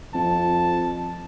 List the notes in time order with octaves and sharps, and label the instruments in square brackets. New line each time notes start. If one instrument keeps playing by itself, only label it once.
[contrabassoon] F2 [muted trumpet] A5